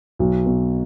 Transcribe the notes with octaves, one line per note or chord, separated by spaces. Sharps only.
B1
B2